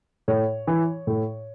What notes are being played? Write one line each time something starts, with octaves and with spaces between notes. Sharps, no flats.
A2 C#5
E3
A2